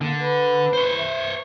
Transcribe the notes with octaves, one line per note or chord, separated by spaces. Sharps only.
D3 A#3
B4
C5 C#5
E5